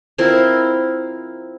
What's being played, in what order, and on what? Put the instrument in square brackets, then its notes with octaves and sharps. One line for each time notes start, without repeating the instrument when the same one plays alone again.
[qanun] F3 C4 E4 A#4